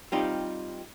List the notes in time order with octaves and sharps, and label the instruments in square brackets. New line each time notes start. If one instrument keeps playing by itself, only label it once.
[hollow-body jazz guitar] G3 C4 D#4 F4 G4